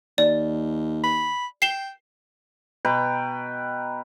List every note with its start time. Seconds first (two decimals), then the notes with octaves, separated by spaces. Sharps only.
0.18 D#2 D5
1.03 B5
1.62 G5 C7 E7 G7
2.85 B2 B4 G5 A#5